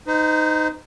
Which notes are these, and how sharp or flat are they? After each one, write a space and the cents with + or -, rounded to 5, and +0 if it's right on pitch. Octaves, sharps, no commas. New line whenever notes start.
D#4 +0 C5 -40